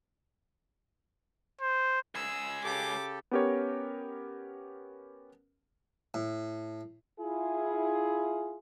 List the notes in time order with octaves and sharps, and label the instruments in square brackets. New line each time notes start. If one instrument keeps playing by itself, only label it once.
[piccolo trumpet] C5
[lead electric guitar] C#2 G#4 [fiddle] E6
[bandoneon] C#3 G4 A4 [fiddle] D6
[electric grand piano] B3 C#4 G4 A#4 C#5
[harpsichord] A2
[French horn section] E4 F4 G#4